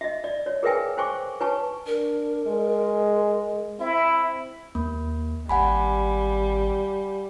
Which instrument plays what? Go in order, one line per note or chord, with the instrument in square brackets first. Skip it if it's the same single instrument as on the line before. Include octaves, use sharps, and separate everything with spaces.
[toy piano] D#5 E5
D5
C#5
G#4 A#4 B4 E5 G5 G#5
C5 G5 G#5 C#6 D6
B4 C#5 G#5 A5 C#6
[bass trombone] D4 [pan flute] A#4
[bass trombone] G#3
[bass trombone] C4 [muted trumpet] E4 [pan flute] E5
[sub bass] D#2 [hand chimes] A#3
[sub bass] G#1 [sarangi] G3 [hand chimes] F#5 G#5 B5